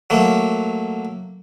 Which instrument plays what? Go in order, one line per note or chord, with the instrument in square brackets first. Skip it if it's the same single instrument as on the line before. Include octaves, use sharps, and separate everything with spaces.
[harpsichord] F#3 A3 A#3